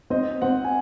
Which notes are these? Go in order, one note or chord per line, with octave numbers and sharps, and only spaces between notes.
C4 D#5
C4 F#5
G#5